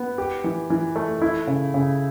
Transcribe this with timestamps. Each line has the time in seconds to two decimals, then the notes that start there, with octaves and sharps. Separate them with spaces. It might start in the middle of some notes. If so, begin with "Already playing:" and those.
Already playing: B3
0.18 G4
0.44 E3
0.70 E3
0.96 A3
1.22 E4
1.47 C#3
1.74 C#3